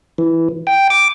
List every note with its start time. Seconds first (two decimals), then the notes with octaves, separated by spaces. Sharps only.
0.18 E3
0.67 G5
0.90 D6